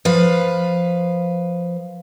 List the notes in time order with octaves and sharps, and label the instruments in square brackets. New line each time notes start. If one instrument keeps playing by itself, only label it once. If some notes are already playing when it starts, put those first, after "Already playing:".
[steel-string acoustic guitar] F3 B4 F5